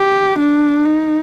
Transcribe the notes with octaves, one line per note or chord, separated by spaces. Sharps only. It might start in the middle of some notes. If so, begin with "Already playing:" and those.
Already playing: G4
D4
D#4